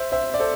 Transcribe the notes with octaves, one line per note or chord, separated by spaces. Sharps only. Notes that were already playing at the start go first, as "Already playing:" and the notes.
Already playing: C5 E5
C5 E5
D5
A4 C5